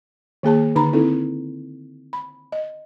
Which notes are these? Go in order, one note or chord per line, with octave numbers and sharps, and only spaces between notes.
D#3 A#3 G#4 A5
D3 D#4 A#5 B5
C4 D#4 E4 A4
B5
D#5